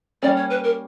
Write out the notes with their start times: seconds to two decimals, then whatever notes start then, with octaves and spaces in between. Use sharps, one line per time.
0.23 G3 A#3 C#4 D5
0.36 C#5
0.50 B4
0.64 A#4